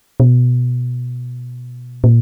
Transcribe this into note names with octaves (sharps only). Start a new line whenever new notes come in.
B2
A#2